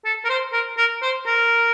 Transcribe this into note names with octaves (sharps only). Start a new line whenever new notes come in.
A4
A#4
C5
A#4
A#4
C5
A#4